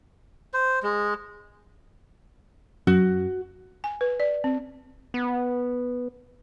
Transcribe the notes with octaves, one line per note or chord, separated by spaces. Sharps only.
C5
G#3
F#2 F#4
G#5
B4
D5
C4
B3